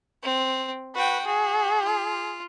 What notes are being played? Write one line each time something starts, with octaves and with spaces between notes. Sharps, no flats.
C4
F#4 B4 G5
F#4 G#4
F4